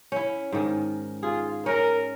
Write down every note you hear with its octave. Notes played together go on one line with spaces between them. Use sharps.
C#4 E4
G#2 D#3
F4 G#4
C#4 A#4